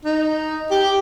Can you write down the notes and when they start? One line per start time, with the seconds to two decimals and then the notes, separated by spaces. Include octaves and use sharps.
0.05 D#4
0.71 G4